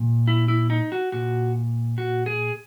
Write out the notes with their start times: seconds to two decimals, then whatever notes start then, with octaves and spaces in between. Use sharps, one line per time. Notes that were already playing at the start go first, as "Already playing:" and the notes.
Already playing: A#2
0.27 E4
0.48 E4
0.70 D#4
0.92 F#4
1.12 A#2 F#4
1.98 F#4
2.26 G#4